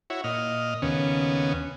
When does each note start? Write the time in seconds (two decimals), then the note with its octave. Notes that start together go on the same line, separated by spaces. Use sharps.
0.10 E4 F#4 C#5
0.24 A#2 D#5 F6
0.82 D#2 C#3 B3 C#4